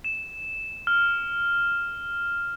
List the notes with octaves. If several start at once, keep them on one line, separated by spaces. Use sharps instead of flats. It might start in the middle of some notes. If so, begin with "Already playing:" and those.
E7
F6